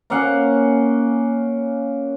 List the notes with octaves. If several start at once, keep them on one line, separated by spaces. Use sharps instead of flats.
A#3 C#4 F5 F#5